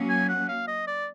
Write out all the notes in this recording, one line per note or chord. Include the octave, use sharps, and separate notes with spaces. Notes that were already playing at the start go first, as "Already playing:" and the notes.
Already playing: F#3 A#3 C#4
G#5
F#5
F5
D#5
D5